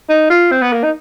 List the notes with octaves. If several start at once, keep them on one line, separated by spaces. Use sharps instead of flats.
D#4
F4
C4
B3
A#3
D#4